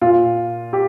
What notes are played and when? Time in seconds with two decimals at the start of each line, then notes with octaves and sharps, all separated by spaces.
0.01 A#2 F4
0.73 G4